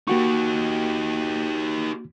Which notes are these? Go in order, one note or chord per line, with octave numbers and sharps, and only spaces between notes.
A#3 D#4 F#4 G4 C#6